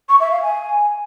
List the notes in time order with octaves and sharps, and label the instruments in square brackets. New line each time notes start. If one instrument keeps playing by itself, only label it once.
[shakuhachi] C#6
E5
F5
G#5